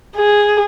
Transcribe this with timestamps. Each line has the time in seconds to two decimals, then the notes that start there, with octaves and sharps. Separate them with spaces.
0.17 G#4